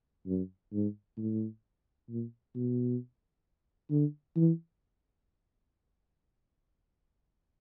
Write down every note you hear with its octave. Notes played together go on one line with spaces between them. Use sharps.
F#2
G#2
A2
A#2
B2
D3
E3